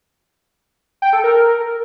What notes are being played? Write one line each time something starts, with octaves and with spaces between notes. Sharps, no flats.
G5
A4
A#4